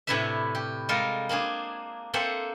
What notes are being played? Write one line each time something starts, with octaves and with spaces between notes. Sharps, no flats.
A2 C3 D4 E4 B4 E5
G4
G3 G#3 F4 A4 A#4
A#3 C4 D4 G#4
A#3 C4 A4 C5 E5 F#5